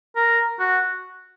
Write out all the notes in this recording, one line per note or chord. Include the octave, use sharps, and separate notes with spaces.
A#4
F#4